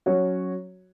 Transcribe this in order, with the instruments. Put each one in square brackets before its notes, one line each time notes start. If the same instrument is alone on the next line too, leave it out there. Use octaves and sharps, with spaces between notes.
[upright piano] F#3 C#4 F#4 C#5